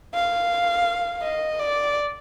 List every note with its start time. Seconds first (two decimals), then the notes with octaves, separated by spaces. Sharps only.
0.14 F5
1.22 D#5
1.59 D5